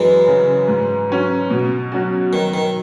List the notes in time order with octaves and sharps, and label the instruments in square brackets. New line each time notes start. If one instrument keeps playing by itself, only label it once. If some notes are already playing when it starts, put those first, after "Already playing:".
Already playing: [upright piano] F#2 [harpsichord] E3 G#3
[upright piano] C#3 F#3
G#2
F#3 C#4
B2
F#3 C#4 F#4
[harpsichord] D#3 [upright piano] F#3
[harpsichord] D#3